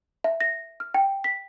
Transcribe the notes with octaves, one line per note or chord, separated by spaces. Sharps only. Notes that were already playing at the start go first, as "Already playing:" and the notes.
E5
A#6
F6
G5
B6